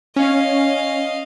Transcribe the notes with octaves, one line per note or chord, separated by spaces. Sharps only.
C#4 D#5 F5